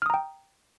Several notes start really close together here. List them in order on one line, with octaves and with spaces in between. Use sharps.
F6 D#6 A#5 G5